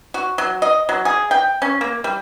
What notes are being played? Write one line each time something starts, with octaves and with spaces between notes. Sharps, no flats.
F#4
F#3
D#5
F#3
G#4
G5
C#4
A#3
G3